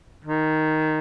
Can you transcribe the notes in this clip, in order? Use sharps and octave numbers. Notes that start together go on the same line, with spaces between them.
D#3